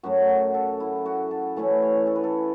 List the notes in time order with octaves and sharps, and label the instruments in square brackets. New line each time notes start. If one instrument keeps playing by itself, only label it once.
[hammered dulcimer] F#2 F#3 A3 F#4
F#4
A4
E4
F#4
A4
E3 A3 C#4 E4 A4
C#5
A4
B4
A4